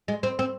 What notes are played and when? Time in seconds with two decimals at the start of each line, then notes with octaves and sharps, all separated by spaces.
0.08 G#3
0.23 C4
0.39 C4